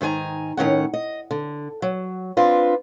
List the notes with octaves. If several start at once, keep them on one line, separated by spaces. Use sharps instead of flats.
G#2 D#3 A4 G#5 A#5
A2 D#3 C#4 F#5
D#5
D3
F#3
C4 D4 F4 B4